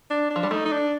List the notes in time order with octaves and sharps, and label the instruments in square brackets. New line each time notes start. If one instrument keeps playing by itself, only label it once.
[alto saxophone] D4
D4
[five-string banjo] F3
G3
[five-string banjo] A3 [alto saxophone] D#4
[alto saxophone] D#4
D4